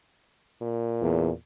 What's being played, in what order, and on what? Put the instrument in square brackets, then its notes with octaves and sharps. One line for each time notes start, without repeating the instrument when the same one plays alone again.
[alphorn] A#2
[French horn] E2